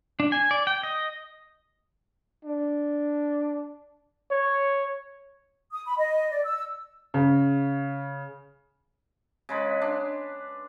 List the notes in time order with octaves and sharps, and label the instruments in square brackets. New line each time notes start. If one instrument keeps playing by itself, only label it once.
[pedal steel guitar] D4
G#5
D5
G5
D#5
[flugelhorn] D4
C#5
[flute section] D#6
B5
D#5
D5
E6
[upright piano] C#3
[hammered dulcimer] C#3 G#3 B4
D4